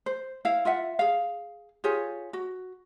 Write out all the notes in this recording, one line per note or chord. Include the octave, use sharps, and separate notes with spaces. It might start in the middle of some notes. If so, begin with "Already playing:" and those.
C5
E4 F5
F4 E5 F#5
G#4 F5
F4 G4 G#4 C#5
F#4